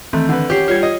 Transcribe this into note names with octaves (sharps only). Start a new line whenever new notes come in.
D#3 E3 A3 C4
D3 B4
C#4 G4 F#5 C7
G3 F4 G4 C#5 G#6
D#5